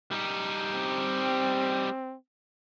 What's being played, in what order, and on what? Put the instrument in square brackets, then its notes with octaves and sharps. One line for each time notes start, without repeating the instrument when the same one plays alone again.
[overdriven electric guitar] G3 D#4
[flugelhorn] C4